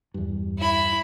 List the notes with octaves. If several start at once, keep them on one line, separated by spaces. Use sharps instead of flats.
E2 G2
E4 B5